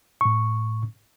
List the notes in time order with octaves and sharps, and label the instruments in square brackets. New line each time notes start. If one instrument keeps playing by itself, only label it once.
[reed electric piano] A2 C#6